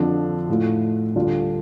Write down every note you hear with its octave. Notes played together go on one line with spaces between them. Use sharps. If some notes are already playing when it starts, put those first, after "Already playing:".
Already playing: F2 D3 F3 D4
A2 A3 F4
D2 D3 G3 D4 F4